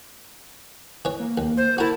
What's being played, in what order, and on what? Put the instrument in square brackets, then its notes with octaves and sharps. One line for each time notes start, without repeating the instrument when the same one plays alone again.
[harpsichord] E3 C#5
[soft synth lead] A#3
[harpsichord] D#2
[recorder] C5
[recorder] E4 [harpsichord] F#4 A#4 [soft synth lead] A5